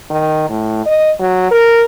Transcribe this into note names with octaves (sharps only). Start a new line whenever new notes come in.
D#3
A2
D#5
F#3
A#4